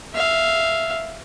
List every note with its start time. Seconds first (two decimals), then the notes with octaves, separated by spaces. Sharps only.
0.14 E5 F5